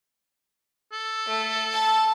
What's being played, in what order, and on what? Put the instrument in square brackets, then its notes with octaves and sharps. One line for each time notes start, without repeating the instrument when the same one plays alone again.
[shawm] A4
[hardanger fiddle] A3
A5